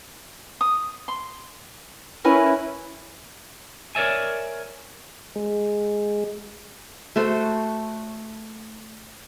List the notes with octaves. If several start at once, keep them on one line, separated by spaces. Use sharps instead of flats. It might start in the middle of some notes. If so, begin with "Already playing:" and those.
D#6
C6
C#4 E4 A#4 B4 G#5
A#4 C#5 D5 E5 G#5
G#3
A3 F#4 A4 C5